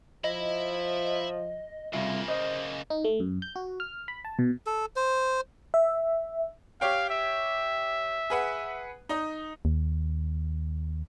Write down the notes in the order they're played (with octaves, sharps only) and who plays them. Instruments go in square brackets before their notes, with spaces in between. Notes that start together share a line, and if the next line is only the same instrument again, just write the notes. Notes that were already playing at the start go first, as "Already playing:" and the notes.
[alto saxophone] F3 [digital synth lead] D#5 [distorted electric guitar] E5 B5
[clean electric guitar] C2 F4 E5 [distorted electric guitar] C#3 A#3
[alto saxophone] C5 [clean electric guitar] D#5
[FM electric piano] D#4
A3
F#2
G6
F#4
F6
B5
A5
B2
[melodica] A4
C5
[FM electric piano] E5
[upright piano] G4 C#5 G5 [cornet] F5
[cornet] E5
[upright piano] G#4 B4 F#5
D#4 D#5
[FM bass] D#2